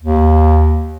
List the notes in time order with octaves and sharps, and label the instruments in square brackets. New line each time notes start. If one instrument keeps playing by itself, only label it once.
[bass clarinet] D#2